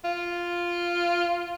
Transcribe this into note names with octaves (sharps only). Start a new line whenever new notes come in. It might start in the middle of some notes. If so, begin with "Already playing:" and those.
F4